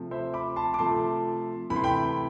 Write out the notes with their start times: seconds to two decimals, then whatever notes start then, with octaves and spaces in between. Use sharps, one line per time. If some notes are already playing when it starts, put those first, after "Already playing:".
Already playing: C3 F3 A3
0.11 C5 E5
0.34 B5 D6
0.56 A5 C6
0.74 D6
0.79 C3 F3 A3 A5 C6
1.70 C3 E3 A3 B5
1.76 C6
1.84 G5 B5